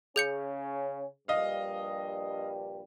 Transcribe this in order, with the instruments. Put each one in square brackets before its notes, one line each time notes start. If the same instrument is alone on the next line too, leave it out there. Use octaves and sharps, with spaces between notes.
[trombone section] C#3 C#4 [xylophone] G#4 G6 C#7
[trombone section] A#1 G2 G3 [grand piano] D#5 F5